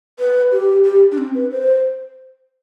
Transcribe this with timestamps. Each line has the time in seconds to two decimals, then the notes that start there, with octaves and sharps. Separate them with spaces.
0.19 B4
0.52 G4
0.85 G4
1.12 D4
1.18 C4
1.35 B4
1.51 C5